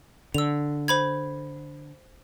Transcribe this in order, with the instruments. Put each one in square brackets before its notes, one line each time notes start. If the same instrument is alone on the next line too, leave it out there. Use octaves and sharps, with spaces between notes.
[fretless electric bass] D3 [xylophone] E6 F7
[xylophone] C5 B5 G#6